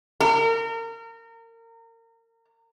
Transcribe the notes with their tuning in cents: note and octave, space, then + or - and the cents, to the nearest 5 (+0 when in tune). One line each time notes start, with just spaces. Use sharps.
A#4 -30